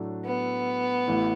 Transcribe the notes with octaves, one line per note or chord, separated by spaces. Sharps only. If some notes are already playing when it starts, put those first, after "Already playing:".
Already playing: A2 F#3 A3 D4
B3
A1 A2 E3